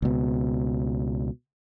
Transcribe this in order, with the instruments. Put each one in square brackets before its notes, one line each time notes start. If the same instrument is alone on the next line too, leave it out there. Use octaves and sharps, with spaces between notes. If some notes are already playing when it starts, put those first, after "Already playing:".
[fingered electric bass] C#2 B2